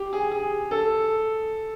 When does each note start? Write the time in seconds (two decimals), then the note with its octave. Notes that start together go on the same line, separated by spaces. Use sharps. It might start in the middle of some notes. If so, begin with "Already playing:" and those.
Already playing: G4
0.13 G#4
0.31 G#4
0.71 A4